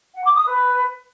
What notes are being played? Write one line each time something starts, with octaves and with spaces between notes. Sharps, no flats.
F#5
D6
D#6
B4